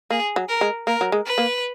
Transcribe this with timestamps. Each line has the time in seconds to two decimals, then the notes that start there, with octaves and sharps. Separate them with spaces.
0.10 A#3 G#4
0.36 F#3
0.49 A#4
0.61 G#3
0.87 A#3 A#4
1.01 F#3
1.12 G#3
1.26 B4
1.38 A#3